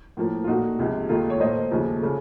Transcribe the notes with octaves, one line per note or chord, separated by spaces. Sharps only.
A2 F3 A#3
F4
A#2 A3 D#4 F#4
C#2 C3 F3
D#2 D#3 A3 F4 A4
C#5
A#2 A3 C5 D#5
D#2 C#3 F3 A3
C#3 A3